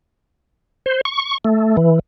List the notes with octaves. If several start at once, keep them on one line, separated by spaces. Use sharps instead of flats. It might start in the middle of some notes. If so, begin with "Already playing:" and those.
C5
C#6
A3
E3